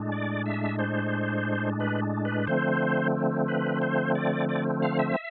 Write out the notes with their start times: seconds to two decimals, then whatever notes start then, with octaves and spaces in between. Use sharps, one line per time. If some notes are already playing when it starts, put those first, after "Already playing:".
Already playing: A2 G#3 D4
0.12 D5
0.46 E5
0.79 C5
1.80 B4
2.25 B4
2.47 D3 F3 A3 C4 C5
3.48 B4
3.82 C5
4.15 D5
4.49 D5
4.82 F5
4.99 E5